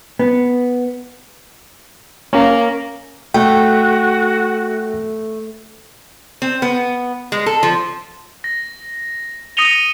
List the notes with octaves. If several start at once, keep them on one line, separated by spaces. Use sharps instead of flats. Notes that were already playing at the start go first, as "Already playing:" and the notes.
B3
A#3 C#4
A3 F#4 G5
C4
B3
G#3
A4
F3
A#6
D#6 A#6 C#7 D#7 F7 G7